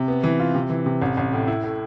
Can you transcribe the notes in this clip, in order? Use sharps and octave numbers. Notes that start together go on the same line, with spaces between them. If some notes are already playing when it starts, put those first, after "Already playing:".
Already playing: C3
B3
E3
F4
C3
E3
C3
A1
A1
A2
E4
A2